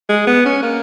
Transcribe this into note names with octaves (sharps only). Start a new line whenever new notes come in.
G#3
B3
C#4
A#3